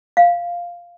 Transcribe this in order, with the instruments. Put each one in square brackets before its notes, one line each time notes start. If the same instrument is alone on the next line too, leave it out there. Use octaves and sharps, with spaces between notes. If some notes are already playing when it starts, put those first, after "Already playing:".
[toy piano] F5